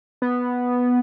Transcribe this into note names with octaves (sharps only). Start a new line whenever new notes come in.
B3